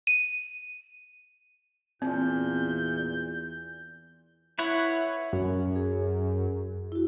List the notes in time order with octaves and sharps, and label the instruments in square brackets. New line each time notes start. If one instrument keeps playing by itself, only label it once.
[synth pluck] D#7
[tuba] E2 [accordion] A#2 [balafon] C4 [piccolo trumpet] G6
[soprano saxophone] E4 [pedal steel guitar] B4 C#5 F#5
[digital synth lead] F#2
[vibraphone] G#4
E4 F#4